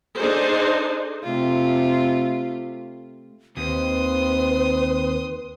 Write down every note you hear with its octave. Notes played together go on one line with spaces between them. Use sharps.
D4 D#4 G#4 A4 C5
C3 A3 F4
D#2 C4 B4 C6 D#6